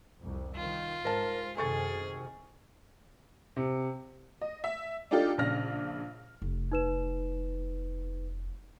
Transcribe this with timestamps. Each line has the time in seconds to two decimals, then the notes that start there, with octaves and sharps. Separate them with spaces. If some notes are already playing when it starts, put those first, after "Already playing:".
0.19 C2 F2
0.56 D#3 F4
1.05 G#2 A#4 C5 A5
1.57 F#2 C3 D#3 G#4 A4 C#6 A6
3.56 C3
4.41 D#5
4.64 E5
5.11 D4 D#4 F4 G4 A4
5.38 A#1 C#3 D4 F6 A#6
6.42 F1
6.72 D#4 B4 E7